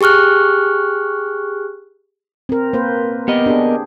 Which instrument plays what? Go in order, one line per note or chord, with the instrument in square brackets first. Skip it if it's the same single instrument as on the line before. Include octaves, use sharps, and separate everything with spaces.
[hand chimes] G4 G#4 C#6 F6 F#6
[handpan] C4 A#4
A#3 B4 C5
[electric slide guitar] B3 A#4 D#5 [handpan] G4
[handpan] D4 G4 G#4